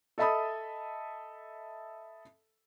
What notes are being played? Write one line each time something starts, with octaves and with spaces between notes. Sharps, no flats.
A4 D#5 E5 A5 B5 D#6